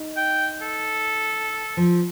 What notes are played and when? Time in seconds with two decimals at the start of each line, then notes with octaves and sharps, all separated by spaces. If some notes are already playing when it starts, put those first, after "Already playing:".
Already playing: D#4
0.17 G5
0.62 A4
1.77 F3